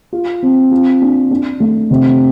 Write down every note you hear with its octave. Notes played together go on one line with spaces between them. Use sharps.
F4
C4
F4
D4
D4
A3
C3